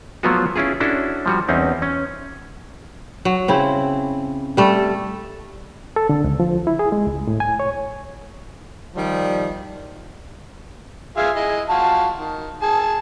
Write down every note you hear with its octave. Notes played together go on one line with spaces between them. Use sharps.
F3 F#3 A3 B3 F4 F#4
C#4 E4 F4 G#4
C#4 D4 E4 F#4 A4
F3 G3 F#4
E2 C4 C#4 D#4
C#4
F#3
C#3 C4 E4
G3 A3 A4
A4
D3
C#2
F3
E4
G#4
G#3
C#2
A2
G#5
C#5
D#3 F3 G3
F4 G#4 E5
E4 G#4 D#5
F4 F#4 A5
D#3
G#4 A5